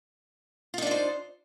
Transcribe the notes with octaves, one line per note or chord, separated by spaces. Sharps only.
D4 D#4 F4 C5 D#5